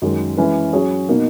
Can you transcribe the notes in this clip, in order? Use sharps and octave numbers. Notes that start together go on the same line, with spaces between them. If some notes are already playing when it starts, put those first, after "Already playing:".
F#2 D#3 G#3 C#4
E3 G#3 C#4 E4 B4
F#3 C#4 G#4 C#5
B2 A#3 D#4